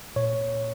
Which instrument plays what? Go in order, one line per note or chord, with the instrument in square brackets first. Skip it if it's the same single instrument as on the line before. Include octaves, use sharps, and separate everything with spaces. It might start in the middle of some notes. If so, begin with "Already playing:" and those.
[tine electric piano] A#2 C#5